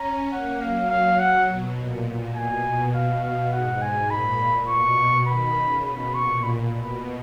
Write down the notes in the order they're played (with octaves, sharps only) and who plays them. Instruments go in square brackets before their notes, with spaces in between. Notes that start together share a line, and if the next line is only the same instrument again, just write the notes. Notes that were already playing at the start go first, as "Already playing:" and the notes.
Already playing: [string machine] C#4 [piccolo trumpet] A#5
[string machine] A#3 [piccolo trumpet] F#5
[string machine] F#3 [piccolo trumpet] F5
[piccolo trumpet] F5
F#5
[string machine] B2
A#2
A#2
[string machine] B2 [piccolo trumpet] G#5
[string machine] B2
[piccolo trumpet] F5
F5
[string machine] G#2 [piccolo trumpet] F#5
[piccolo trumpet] G#5
[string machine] A#2 [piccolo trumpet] B5
[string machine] B2 [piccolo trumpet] C#6
[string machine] D#3 [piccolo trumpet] B5
[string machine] C#3
[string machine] B2 [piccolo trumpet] B5
[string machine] A#2 [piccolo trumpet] C#6
[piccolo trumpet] B5
[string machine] B2